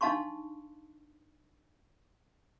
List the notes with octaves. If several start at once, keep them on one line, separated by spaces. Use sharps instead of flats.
D4 D#4 F5 A5 C6 C#6